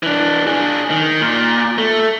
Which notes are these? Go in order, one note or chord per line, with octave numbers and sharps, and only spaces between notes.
E3 D4
D4 G#4
D#3
A#2
A3